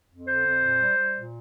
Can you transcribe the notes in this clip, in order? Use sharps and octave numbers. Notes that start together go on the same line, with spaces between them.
F2
D3 C5
F2
A#2
G3
G3
A#2